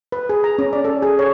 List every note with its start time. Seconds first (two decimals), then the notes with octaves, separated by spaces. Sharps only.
0.12 B4
0.29 G#4
0.44 A#5
0.59 C#4
0.73 D5
0.85 A4
1.02 G#4
1.19 C#5